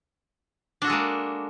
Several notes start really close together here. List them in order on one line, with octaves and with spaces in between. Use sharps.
D4 F#4 A4 G#3 A#3